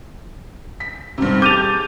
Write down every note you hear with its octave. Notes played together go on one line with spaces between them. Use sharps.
B6
B1 G2 C3 C4
G4 G#4 A5 D6 G6 A6 D#7 F7